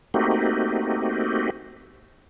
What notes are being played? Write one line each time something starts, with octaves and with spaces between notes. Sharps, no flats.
A3 A#3 C4 D#4 F#4 G4